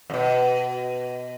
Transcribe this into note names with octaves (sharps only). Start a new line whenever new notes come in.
F2 B2